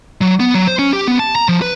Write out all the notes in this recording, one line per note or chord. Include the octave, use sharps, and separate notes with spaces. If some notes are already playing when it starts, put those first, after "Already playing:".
F#3
B3
F#3
C5
C#4
G4
B3
A5
A#5
F3
B4